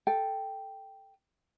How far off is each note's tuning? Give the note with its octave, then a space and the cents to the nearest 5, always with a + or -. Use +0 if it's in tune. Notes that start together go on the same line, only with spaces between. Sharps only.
A4 +0 G5 +0